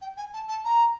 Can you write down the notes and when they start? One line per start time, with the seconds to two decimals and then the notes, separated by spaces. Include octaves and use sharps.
0.01 G5
0.17 G#5
0.33 A5
0.48 A5
0.64 A#5